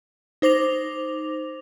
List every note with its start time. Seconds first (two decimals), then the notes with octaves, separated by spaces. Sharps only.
0.42 D#4 C5 D6 A#6 F7